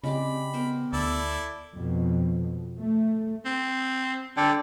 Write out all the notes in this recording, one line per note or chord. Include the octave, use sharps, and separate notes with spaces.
C#3 G#3 C4 G4 D5 B5
B3 A#4 C5
D2 E4 A4 D5
F2 B2
A3
C4
D3 A4 D5 G5